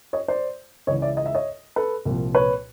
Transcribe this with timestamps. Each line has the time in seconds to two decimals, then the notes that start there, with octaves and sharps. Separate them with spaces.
0.13 C#5 D#5
0.28 C5 D5
0.87 C#2 C#3 E3 C#5 D#5
1.02 D5 E5
1.17 D#5
1.26 E5
1.35 C#5 D#5
1.76 A4 B4
2.05 C2 A#2 F3
2.35 B4 C#5